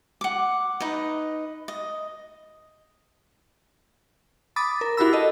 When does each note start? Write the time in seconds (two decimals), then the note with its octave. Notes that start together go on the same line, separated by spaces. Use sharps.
0.21 F#5 D6
0.80 D#4 B4 D#5
1.68 D#5
4.56 B5 D6 D#6 A6
4.81 A#4
4.97 E4 F#4 G4 B5 E6
5.13 A4 D#5